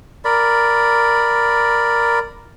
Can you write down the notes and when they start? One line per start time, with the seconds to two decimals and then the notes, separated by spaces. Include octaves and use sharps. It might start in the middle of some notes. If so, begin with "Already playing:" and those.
0.25 A#4 D5 B5